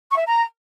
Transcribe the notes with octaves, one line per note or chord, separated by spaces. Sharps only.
C#6
E5
A#5